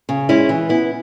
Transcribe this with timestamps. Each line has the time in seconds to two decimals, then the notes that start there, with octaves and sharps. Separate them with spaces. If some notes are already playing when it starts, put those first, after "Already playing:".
0.09 C#3
0.29 G#3 C#4 E4
0.49 E3
0.69 B3 E4